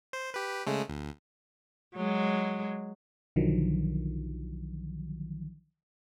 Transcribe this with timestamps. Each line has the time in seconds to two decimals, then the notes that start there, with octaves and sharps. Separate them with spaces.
0.13 C5
0.34 G4 B4
0.67 C#3 G#3 A3
0.89 D2
1.95 F#3 G#3
3.36 B1 D3 D#3 F3 F#3